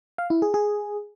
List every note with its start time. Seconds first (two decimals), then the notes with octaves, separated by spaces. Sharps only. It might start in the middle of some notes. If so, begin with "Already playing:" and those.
0.18 F5
0.30 E4
0.42 G#4
0.54 G#4